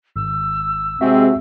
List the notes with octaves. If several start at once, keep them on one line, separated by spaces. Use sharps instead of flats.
G#1 E6
C3 G#3 C4 F#4 E5